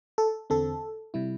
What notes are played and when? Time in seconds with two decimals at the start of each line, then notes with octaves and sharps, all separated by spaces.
0.18 A4
0.50 E2 D3 C4 A4
1.14 C3 G3 E4